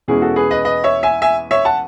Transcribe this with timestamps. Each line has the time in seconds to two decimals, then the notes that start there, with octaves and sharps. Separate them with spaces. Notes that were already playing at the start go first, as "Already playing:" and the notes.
0.08 E2 B2 G#3 C#4 E4 G#4
0.22 F#4 A4
0.36 G#4 B4
0.51 B4 D#5
0.65 B4 D#5
0.84 C#5 E5
1.03 E5 G#5
1.22 E5 G#5
1.51 C#5 E5
1.65 F#5 A5